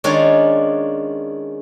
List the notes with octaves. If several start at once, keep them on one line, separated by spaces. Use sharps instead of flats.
D#3 G#3 C#4 D4 F4 C#5